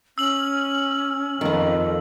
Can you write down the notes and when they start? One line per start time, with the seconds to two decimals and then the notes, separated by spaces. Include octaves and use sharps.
0.18 C#4 E6 F#7
1.41 F2 D#3 B3